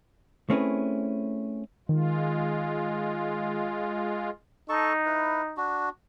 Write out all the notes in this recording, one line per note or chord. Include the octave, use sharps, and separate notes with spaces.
A3 C4 C#4 E4 G#4 B4
D#3 G#3 F4
D#4 A4 A5 C#6
E4 B4
D4 F#4